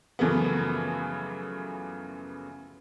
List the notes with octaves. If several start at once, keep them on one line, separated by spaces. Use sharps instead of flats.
F#2 C#3 E3 F3 A3 B3